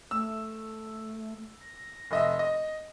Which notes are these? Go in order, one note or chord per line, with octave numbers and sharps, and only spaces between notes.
A3 E6
A#6
F1 D#5 E5
D#5